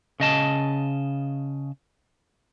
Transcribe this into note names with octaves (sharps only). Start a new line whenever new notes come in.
C#3 D#5 A5